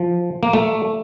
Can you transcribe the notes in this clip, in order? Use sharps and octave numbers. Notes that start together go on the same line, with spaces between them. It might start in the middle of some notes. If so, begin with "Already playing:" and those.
Already playing: F3
A#3
A3